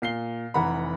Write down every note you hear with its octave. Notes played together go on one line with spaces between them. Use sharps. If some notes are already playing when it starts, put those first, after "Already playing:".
A#2 C7 G7
F1 E3 F#5 A#5 B5